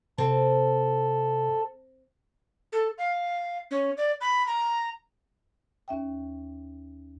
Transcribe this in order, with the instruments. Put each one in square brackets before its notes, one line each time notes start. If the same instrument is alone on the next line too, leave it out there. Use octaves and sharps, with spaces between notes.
[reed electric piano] C3 [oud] C4 [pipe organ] A4
[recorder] A4
F5
C#4
D5
B5
A#5
[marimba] D#2 C#4 E5 G5